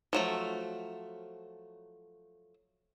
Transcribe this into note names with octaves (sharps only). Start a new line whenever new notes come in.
F3 F#3 A3